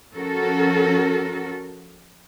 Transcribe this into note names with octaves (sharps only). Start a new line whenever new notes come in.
F3 C#4 F#4 A4 A#4